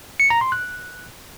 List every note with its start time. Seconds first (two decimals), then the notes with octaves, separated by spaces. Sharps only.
0.20 C#7
0.30 A#5
0.41 C6
0.52 F#6